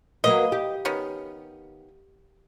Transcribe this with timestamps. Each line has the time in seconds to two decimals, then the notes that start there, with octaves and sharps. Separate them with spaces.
0.24 F#3 A#3 B4 D#5
0.52 G4
0.85 D#3 B3 C#4